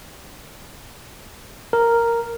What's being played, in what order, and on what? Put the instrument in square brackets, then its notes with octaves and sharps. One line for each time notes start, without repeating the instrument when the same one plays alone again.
[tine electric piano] A#4